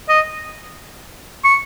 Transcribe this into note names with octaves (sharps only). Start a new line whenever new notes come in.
D#5
C#6